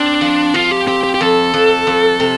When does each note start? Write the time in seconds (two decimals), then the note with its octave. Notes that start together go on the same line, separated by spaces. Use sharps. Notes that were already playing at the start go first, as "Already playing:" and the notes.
Already playing: C4 D4
0.21 F3
0.54 F3 F4
0.71 G4
0.87 C4 G4
1.03 G4
1.14 G4
1.21 F2 A4
1.54 F2
1.87 F2
2.20 C3